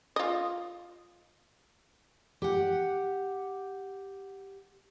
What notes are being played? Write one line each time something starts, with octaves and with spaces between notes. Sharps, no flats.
F4 D#5
G4 F#5